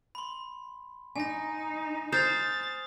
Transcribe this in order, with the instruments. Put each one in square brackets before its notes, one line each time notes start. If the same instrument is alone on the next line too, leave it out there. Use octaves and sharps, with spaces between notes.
[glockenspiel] B5 C6
[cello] D#4 [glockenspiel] G#5 A#6
[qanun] C5 [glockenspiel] D#6 F6 F7 [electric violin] A6